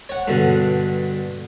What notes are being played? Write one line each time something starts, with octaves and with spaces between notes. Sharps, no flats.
C#5 F#5
G2 B2 D3